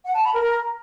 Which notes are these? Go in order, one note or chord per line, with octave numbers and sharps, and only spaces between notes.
F#5
A5
B5
A#4